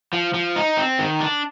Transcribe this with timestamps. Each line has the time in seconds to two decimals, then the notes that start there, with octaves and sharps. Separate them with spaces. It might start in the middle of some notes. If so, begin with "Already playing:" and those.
0.13 F3
0.34 F3
0.56 D#4
0.77 C4
0.99 D#3
1.20 D4